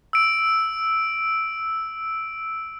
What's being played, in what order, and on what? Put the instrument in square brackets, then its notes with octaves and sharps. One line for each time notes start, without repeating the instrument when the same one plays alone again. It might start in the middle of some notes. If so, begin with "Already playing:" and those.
[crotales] E6 D7